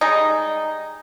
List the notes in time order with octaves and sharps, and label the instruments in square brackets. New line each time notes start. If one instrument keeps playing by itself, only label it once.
[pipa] G3 G#3 D#4